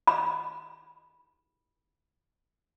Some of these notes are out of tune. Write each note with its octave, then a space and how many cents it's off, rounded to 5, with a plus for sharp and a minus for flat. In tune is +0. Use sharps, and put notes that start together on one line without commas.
B5 -10